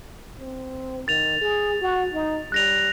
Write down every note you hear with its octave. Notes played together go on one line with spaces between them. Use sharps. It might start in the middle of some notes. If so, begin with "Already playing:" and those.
C4
D#3 A6 F7
G#4
F#4
D#4
G3 F#6 A#6 F7